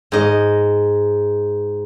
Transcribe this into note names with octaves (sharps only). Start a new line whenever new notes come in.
G#2 D#5